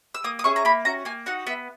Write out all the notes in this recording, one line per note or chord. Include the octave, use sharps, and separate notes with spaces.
E6
A#3 D#6
D#6
C#4 E4 G#4 C#6
A#5
A#3 B5
C#4 F#4 A#5
A#3 G#5
D#4 F#4 F#5
B3 E5